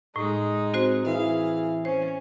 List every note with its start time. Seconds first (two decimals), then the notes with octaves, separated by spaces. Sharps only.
0.16 A2 G#3 D#4
0.74 C4 F#4 C5
1.07 E3 G#4 F5
1.85 C#4 C5